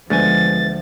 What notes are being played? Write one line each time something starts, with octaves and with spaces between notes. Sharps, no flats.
D2 F3 G#3 A3 B3 G#5 A6